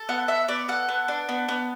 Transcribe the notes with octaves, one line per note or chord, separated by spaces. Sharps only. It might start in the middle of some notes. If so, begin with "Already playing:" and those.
Already playing: A4
B3 F#5
B3 E5
B3 D5
A4 F#5
B3
D4
B3
B3